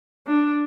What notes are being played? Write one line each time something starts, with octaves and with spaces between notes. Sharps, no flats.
D4